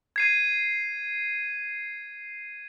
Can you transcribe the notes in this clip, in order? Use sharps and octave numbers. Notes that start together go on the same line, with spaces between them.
G#6 C7 D#7